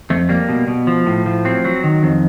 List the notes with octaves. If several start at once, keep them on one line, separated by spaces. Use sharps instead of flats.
F2 A3
G3 A#3
B2
B2
F3
A2
F3
F#3 C4
F#3
D#3
F2